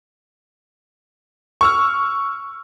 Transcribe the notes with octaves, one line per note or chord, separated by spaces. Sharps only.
C#6 E6 F6